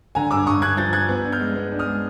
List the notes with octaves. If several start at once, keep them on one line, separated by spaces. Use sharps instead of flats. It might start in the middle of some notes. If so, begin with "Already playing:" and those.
D3 G#5 A#5
G2 D6 E6
G2 C#6 D#6
G2 F#6 G#6
F3 G6 A6
F3 F#6 G#6
B3
D4
F6 G6
G#3
B3
D4
D#6 F6
G#3